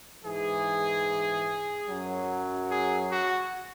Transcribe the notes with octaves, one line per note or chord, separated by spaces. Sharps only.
G#2 E3 G#4
F#2 F#3
G#4
F#4